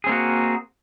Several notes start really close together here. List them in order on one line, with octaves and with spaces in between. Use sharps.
G#4 C4 A#3 F#4